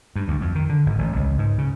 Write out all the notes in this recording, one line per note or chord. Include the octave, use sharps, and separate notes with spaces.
G2
D2
F2
D#3
D3
G#1
A1
C#2
G#2
C#3